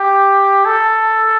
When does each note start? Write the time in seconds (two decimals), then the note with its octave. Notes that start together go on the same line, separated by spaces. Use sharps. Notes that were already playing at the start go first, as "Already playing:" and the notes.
Already playing: G4
0.65 A4